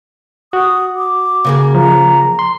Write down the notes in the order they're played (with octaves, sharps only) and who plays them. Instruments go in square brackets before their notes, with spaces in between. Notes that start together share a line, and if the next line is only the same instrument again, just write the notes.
[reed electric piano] F#4 [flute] D#6
[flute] D6
[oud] C#3 A#3 G#4
[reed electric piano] F3 [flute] A#5
[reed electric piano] C6